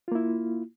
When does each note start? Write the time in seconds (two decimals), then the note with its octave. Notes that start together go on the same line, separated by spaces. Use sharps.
0.08 F4
0.12 A#3
0.15 E4